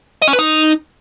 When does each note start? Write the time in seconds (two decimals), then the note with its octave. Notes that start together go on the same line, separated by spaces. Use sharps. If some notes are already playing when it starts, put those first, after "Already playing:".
0.22 D#5
0.28 C#4
0.33 B4
0.39 D#4